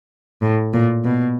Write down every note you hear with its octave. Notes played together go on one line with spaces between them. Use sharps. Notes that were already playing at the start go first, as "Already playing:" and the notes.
A2
A#2
B2